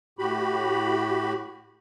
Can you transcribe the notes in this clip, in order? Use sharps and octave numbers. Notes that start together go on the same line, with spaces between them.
A2 F#4 G4 B5